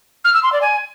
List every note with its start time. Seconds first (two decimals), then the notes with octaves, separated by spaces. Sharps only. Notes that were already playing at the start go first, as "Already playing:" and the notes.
0.24 F6
0.34 E6
0.43 C6
0.52 D5
0.61 G#5